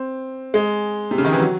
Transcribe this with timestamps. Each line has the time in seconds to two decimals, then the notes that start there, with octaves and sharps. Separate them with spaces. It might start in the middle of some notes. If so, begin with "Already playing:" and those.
Already playing: C4
0.54 G#3
1.11 C3
1.18 C#3
1.25 D#3
1.32 E3
1.40 F#3